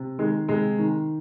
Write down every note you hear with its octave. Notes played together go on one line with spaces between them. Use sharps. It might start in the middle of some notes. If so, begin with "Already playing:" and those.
Already playing: C3
D#3 G#3
C3 G#3
D#3